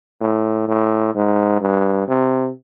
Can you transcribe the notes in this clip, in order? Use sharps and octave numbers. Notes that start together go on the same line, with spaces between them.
A2
A2
G#2
G2
C3